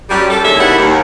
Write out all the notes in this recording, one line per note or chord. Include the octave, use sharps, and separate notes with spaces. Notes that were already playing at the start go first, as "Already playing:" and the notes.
F#2 F#3 G3
A4
D#2 D3 G#3 C#4 E5
B2 D#3 G3 E4 F#5
D#2